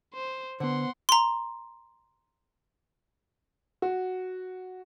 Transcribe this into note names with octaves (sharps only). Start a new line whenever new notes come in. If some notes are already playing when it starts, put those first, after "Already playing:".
C5
D3 B3 C5 F#5 C6
A#5 C6
F#4